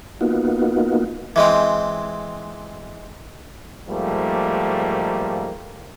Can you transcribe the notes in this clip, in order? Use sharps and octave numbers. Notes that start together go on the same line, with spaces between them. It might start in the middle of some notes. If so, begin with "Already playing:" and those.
A#3 B3 D#4 F4 F#4
E3 G#3 C4
G#2 F3 G3 A3 A#3